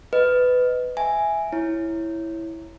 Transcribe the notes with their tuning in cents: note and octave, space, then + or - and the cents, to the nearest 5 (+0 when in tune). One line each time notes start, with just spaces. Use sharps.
B4 +15 D#5 +0
E5 +0 G#5 +0
E4 +0 C#5 -10